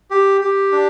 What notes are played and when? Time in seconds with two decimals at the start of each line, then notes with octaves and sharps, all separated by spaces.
0.11 G4
0.41 G4
0.72 D4